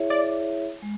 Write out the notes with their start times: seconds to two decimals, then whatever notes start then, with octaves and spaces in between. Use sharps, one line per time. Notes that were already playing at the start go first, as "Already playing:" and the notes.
Already playing: E4 G#4 C#5 E5
0.10 D5
0.82 G#3